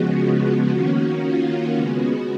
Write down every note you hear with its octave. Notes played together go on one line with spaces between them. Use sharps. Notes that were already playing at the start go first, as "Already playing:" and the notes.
Already playing: C#3 F3 G#3 B3 F#4
F#4
D#3 A#3 C#4
F4
C#3 G#3 B3 F#4